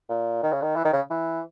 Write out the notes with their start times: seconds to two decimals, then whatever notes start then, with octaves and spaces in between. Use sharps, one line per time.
0.09 A#2
0.43 D#3
0.52 C#3
0.62 D#3
0.76 E3
0.85 D#3
0.93 C#3
1.10 E3